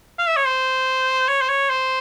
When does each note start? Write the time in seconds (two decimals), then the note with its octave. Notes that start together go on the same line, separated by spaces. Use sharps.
0.19 F5
0.28 E5
0.37 C#5
0.46 C5
1.29 C#5
1.41 C5
1.49 C#5
1.70 C5